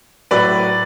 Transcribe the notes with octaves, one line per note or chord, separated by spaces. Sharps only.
A2 F#3 B4 D5